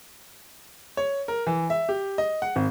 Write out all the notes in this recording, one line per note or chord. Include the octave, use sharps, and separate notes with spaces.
C#5
A#4
E3
E5
G4
D#5
F#5
G#1